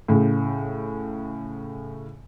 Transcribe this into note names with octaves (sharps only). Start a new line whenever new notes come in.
A2 C#3